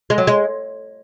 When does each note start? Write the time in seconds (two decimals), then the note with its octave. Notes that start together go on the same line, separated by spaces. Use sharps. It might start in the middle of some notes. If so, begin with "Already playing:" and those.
0.10 G#3
0.18 F#3
0.27 G#3